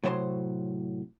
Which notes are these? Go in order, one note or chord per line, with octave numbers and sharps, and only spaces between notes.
A2 C3 F#3 C5 A#5 C6